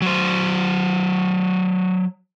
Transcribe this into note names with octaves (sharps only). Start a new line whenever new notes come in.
F#3 C5